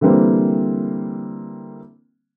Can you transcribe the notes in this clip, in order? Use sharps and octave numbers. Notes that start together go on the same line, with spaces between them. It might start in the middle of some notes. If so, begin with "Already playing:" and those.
D3 E3 G3 A#3 C4